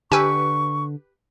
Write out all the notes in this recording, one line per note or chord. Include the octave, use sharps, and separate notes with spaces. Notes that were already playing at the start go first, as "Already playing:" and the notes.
D3 G4 B4 G#5 C#6 E6